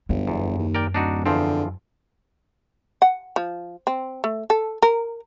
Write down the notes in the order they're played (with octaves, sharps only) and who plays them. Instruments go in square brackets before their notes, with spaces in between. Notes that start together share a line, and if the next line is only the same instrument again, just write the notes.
[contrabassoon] G1 [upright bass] F#2
[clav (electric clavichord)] E2
[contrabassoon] D#2
[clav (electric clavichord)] A#4 D5 G5
[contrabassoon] D1 [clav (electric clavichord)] D4 D#4 F#4
[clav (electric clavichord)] E2 F3 C4 [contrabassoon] D3
[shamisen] F#5
F3
C4
A3
A4
A#4